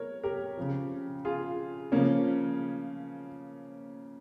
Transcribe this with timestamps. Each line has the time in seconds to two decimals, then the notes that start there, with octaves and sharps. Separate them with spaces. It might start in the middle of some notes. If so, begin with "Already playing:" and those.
Already playing: A#4 C#5
0.23 G4 A#4
0.57 C#3 F3
1.25 F4 G#4
1.92 C#3 F3 A#3 C#4